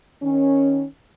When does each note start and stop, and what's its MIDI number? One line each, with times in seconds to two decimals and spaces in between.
0.23 0.86 51
0.23 0.86 61